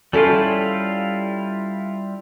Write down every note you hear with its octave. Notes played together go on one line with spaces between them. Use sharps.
G3 C#4 E4 F4 G#4 A4